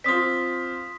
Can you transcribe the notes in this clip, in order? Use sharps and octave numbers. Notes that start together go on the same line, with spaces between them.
C4 F4 C6 D#6 B6